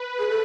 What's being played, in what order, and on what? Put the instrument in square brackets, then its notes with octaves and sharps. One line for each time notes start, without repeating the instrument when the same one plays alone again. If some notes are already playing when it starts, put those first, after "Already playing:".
Already playing: [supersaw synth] B4
[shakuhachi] G#4
A4